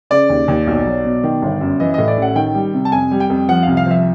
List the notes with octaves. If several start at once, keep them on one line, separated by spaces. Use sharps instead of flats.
C#3 D5
D#2
D#2
B1
F#3
B2
D#3
G1
F#2
E3 D#5
A2 D#5
D5
A1 F#5
D#3 G5
G3
C3
A5
F2 G#5
G3
G5
F2
F3 F#5
C2 F5
F5
F3 E5